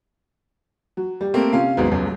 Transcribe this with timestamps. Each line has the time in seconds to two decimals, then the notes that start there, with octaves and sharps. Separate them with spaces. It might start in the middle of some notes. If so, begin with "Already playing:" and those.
0.97 F#3
1.21 G3
1.34 A3 A#3 C4
1.53 C3 C#4 F4 F5
1.77 G#1 G#2 F#3 B3
1.91 D#1 C#2 F#2